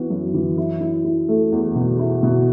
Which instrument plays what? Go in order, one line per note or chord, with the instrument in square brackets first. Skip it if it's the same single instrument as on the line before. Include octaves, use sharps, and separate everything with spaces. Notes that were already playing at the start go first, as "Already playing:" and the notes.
Already playing: [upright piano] E3 B3 F#4
F#2
E3
E4
E4
E4
A3
E2
B2
E4
B2